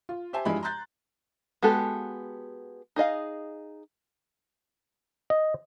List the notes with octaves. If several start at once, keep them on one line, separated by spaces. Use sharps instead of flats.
F4
G4 C5 E5 G#5 A5
G2 F3 G#3 E4 B5
A#5 C6 F#6 G6 A6
G#3 B3 F#4 G4 A4
D#4 G#4 D#5 F5
D#5